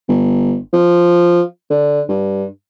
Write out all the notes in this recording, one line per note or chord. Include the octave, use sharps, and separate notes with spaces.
G1
F3
D3
G2